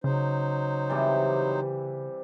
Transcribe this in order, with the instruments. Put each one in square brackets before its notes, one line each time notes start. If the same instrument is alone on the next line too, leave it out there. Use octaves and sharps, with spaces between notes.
[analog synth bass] C#3 [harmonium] F#3 D#4 C5
[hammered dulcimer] C3 E3 G3